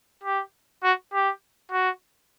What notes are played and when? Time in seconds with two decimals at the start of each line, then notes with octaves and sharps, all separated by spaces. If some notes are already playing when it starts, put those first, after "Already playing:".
0.24 G4
0.83 F#4
1.12 G4
1.72 F#4